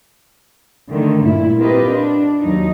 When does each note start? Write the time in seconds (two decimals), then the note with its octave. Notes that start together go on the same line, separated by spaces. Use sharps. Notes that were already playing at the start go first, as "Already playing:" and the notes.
0.89 D3 D#3 A3
1.23 G2 A#2 E4
1.59 C4 F4 G4 A#4 B4 D#5
1.90 D4
2.41 D#2 F#3 D#4